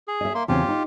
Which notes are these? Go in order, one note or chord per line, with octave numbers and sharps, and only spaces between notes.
G#4
D#5 E5
A#3 C6
E2 C#3 C4 F4 G4
D#4